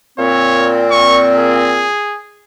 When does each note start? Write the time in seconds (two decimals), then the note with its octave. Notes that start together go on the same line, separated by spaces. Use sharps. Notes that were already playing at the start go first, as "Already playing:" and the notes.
0.18 A#2 C4 C#5
0.91 C#6
1.38 G#4